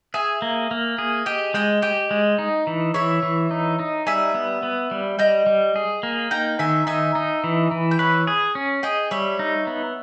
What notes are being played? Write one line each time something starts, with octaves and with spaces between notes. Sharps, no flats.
G#4 E5 G#5
A#3
A#3
G#4
G4 D#5 G5
G#3 D#5 G5
G4 D#5 G5
G#3
D#4
E3
E3 C#5 E5
E3
D#4
D#4
G3 E5 G#5
B3
B3
G3
G3 D#5 G5
G3
G#4
A#3
D#4 G5 A#5
D#3 E5 G#5
D#4 E5 G#5
D#4
E3
E3
G5
B4 C#5 E5
G#4
C#4
G#4 D#5 G5
G3 C#5 E5
D#4
B3